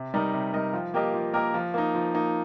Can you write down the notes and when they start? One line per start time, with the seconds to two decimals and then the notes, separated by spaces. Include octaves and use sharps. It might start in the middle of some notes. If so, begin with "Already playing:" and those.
Already playing: C3
0.14 G3 D#4 A#4 D#5
0.33 C3
0.54 G3 D#4 A#4 D#5
0.73 F3
0.94 A#3 G4 A#4 D#5
1.14 F3
1.33 A#3 G4 A#4 D#5
1.54 F3
1.74 A#3 D#4
1.95 F3
2.14 A#3 D#4